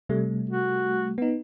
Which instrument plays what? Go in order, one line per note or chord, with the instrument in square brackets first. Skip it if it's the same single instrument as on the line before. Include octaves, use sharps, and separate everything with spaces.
[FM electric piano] C3 G3 A3
[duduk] F#4
[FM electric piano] B3 D#4